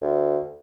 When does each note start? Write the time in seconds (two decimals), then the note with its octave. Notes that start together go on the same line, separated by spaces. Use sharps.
0.02 D2